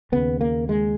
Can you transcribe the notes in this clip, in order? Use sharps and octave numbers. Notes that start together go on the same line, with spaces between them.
D#2 C#3 B3
A#3
G#3